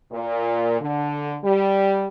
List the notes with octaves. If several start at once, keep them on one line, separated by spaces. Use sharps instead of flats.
A#2
D3
G3